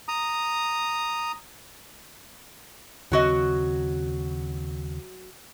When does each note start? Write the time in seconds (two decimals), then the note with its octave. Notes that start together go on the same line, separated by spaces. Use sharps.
0.08 A#5 D#6
3.12 D#2 C#3 F#3 C4 F#4 D#5